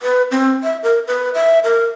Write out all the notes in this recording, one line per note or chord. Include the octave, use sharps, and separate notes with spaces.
B4
C4
E5
A#4
B4
E5
A#4